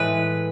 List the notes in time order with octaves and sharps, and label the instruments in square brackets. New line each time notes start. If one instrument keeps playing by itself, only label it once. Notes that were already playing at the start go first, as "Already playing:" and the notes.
Already playing: [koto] A2 E3 G#3 B4